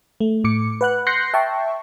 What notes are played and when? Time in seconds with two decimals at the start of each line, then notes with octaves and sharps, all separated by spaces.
0.20 A3
0.44 A2 D6 C#7
0.81 B4 F#5 F#6
1.07 C6 F#6 G6 A#6 C7 C#7
1.34 E5 G5 A5 C#6